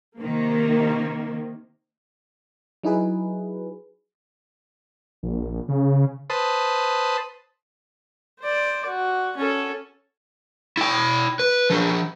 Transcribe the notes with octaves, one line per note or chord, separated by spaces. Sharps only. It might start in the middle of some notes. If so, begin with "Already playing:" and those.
C3 D#3 A#3
F#3 D#4 E4 G#4 B4
A#1
C#3
B4 C5 A5 D#6
C5 D5
F#4
C#4 A4
E4 G5
B4
F3 D4